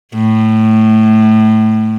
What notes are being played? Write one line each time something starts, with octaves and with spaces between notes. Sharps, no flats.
A2